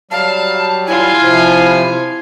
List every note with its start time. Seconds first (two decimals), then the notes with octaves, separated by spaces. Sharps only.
0.11 F#3 G3 F5 A5
0.87 E4 F4 G#5
1.23 C3 F3